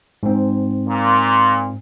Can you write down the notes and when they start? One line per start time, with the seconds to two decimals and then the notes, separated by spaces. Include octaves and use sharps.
0.23 G#2 C4
0.89 A#2